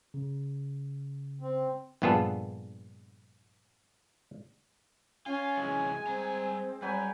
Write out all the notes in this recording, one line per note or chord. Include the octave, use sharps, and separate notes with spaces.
C#3
C4
A#1 G2 B3 F4 G#4 A4
C#4 F4 G#5
C3 E3 F#3 G#3
G3 C4 A#5
F#3 G3 B4 G5 G#5